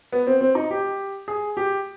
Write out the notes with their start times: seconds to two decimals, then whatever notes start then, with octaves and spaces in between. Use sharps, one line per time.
0.12 B3
0.27 C4
0.41 C4
0.55 D#4
0.71 G4
1.28 G#4
1.57 G4